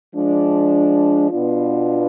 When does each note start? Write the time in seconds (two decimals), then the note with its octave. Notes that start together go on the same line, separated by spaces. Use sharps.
0.15 F3 G#3 D4
1.31 B2 B3 D4 F4